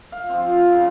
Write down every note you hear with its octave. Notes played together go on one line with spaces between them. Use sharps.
F5
F3 C4
C#3